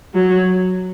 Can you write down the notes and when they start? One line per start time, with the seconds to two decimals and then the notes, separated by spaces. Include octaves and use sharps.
0.14 F#3